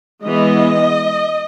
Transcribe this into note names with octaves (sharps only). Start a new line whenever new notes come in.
E3 G#3 B3 D#5